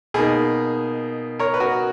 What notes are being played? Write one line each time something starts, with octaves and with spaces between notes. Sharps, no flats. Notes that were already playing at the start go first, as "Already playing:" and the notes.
B2 A#3 D#4 G#4
A#4 C#5
B4
F#4 A#4